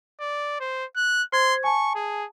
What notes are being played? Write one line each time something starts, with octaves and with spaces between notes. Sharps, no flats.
D5
C5
F#6
C5 C6 G#6
G#5 A5 C#6
G#4